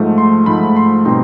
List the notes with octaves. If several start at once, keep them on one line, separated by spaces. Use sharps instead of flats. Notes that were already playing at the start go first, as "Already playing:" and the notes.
Already playing: G#2 F3 A3
C6
G#2 F3 A3 B5
C6
B2 G3 C4 D#4 C6